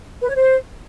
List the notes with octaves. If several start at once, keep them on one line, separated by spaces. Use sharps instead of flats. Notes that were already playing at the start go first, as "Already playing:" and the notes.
B4
C#5
C5